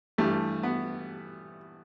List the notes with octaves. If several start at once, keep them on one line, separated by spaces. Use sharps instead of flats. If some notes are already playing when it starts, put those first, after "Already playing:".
G2 E3 G3 A3
B3